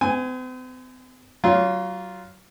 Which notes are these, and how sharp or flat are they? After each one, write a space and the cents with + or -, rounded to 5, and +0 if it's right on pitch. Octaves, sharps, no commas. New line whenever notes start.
C4 -45 G#5 +0
F#3 +25 F4 +0